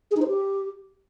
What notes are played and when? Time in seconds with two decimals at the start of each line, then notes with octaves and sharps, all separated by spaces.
0.11 G#4
0.16 D#4
0.22 C5
0.27 G4